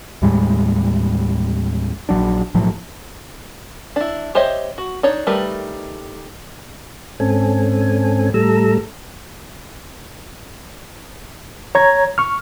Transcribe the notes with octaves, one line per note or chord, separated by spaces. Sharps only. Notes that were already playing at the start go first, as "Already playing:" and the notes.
D#2 A2 G3 G#3
A#1 E2 F#3 D4
B1 A2 F3 F#3
D4 E4
G4 C5 C#5 D#5 E5
F#4
D4 D#4 C#5
D#3 G3 A3 A#4 B4
G#2 C4 C#4 A4 G#5
A2 G3 A3 A4 A#5 E6
C#5 A#5 G#6
C#6 F6